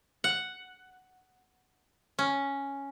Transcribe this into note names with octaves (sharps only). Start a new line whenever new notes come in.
F#5
C#4